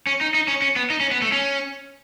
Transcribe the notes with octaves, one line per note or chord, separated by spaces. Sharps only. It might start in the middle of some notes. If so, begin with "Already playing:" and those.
C#4
D#4
D#4
C#4
C#4
B3
D#4
C#4
B3
A3
C#4